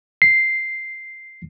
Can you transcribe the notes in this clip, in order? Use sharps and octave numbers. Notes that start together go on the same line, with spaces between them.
C7